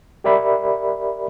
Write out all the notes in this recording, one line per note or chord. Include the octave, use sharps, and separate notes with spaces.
G4 A#4 D5 E5 B5